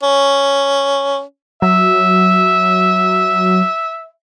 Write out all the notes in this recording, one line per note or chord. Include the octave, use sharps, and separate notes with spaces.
C#4
F#3 E5